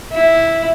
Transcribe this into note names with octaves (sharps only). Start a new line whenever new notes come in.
E4